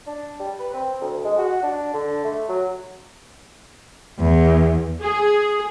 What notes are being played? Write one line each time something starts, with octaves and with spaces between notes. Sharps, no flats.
D4
G3
B4
C4
D2
G#3
F#4
D4
D3
A3
F#3
E2
G#4